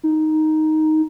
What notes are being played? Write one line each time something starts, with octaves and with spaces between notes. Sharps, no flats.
D#4